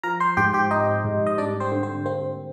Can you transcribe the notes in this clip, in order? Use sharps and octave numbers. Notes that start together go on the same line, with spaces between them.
F3 A#4 A#5
C5 C6
G#2 G4 G5
G4 G5
C4 D#4 D#5
G#2
D#5
G3 D4 D5
C4 C5
D3
C4 C5
A#3 C4 C5